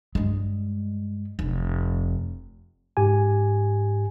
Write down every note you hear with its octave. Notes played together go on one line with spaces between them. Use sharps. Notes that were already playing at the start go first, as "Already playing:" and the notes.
G2 G#3
F1
G#2 G4 G#5